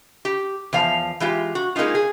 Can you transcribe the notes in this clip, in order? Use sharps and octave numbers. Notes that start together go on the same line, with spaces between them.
G4
E2 F3 F5 A5
E3 G#3 F4 G4
F#4
G#3 A#3 C#4 D#4 F4
G#4